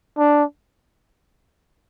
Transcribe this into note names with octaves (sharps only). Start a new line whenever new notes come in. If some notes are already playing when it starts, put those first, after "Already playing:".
D4